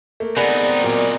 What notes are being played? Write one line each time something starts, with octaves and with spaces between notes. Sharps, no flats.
A3 A#3
B3 C4 D#4 G#4 A#4 D5 F#5
A#2 F#3 A#3